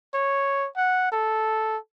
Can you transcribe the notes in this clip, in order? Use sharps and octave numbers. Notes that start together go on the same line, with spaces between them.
C#5
F#5
A4